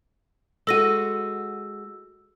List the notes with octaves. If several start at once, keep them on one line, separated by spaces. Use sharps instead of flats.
G#3 F#4 A4 E6 A#6 D#7